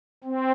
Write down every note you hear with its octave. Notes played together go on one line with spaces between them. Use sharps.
C4